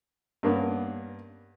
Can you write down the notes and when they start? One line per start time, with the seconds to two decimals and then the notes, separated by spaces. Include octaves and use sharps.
0.43 G2 A#3 B3 C#4